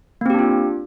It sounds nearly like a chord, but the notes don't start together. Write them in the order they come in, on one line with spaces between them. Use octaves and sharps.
A#3 C4 G4 D4 F4